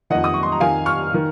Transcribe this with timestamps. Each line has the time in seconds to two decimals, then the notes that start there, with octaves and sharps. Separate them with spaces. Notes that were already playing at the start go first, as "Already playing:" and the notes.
0.10 F2 D#3 D#5 F#5
0.24 D#6
0.34 C#6
0.43 C6
0.52 A#5
0.60 F2 D#3 F5 G#5
0.86 C#6 F6
1.14 D#3